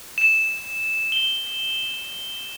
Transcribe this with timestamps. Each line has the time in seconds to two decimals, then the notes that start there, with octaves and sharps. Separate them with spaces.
0.18 E7
1.12 G7